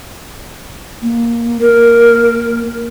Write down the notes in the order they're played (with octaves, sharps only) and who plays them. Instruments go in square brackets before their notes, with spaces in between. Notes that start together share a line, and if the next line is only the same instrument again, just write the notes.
[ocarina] A#3
[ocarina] A#3 [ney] A#4